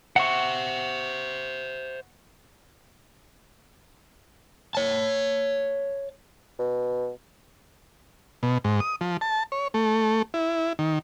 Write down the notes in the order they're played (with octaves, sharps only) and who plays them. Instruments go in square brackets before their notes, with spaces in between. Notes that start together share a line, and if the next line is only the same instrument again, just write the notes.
[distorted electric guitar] C5 E5 [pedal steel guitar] F#5 C#6
[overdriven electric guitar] C#5 A5
[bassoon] B2
[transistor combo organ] B2
G#2
D#6
F3
A5
C#5
A3
E4
D#3